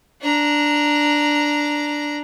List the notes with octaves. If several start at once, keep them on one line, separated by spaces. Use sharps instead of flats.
D4 A#5